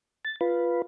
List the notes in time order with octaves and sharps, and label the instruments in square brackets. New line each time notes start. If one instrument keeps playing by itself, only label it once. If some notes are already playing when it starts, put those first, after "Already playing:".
[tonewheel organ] A6
F4 B4